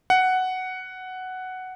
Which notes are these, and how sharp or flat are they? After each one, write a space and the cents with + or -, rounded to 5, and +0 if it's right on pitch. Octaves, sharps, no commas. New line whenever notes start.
F#5 +5